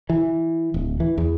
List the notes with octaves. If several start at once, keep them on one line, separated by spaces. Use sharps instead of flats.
E3
D1
E3
E2